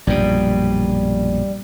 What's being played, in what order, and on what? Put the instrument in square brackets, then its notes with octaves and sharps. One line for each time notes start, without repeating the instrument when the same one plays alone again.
[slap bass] A#1 F#2 B2 [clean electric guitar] G3